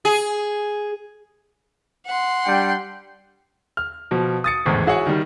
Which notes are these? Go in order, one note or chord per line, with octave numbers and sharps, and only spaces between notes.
G#4
F#5 C6
G3 D4 G5
F6
B2 F3
D#6 A6 C#7
G#1 E2 A2
E4 F#4 G#4 C#5 F#5
D#3 G3